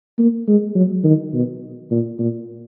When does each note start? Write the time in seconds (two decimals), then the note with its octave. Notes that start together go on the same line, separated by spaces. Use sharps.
0.19 A#3
0.48 G#3
0.75 F#3
1.04 D#3
1.34 B2
1.91 A#2
2.19 A#2